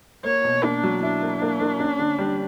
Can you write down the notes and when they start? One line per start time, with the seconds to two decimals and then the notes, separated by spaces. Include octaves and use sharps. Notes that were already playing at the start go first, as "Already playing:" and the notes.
0.24 A#3 C#5
0.44 B2
0.63 A#3 D4
0.83 F#3
1.03 D4 E4
1.22 A#3
1.42 A#3
1.61 A#3
1.80 C#4
1.99 D3
2.18 G3